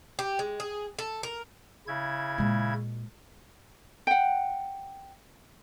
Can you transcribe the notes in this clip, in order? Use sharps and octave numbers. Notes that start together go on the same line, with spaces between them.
G4
G#3
G#4
A4
A#4
C#3 E4 G#6
A#2 G#3
F#5 G5